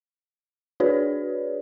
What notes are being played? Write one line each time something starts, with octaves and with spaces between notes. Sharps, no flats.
D4 F#4 G#4 B4 C#5 D5